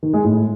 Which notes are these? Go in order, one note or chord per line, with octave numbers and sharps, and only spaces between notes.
D#3
G#3
A2